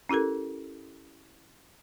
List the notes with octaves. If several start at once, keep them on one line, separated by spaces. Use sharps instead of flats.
C#4 E4 G4 A4 A#4